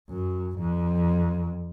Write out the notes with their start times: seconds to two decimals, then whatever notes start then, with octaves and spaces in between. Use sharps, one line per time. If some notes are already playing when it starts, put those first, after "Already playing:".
0.10 F#2
0.59 F2